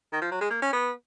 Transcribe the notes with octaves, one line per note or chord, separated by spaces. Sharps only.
D#3
F3
F#3
G#3
A#3
C#4
B3